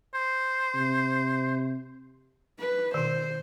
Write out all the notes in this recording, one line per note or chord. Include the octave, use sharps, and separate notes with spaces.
C5
C3
B4
B2 D#3 C5